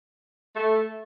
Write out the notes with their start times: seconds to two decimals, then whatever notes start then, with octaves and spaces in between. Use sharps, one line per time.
0.56 A3